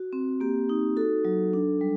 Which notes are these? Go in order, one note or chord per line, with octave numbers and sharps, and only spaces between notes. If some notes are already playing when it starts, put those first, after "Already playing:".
Already playing: F#4
C4
A#3 G4
D#4
F#4 A4
F#3
D4
G3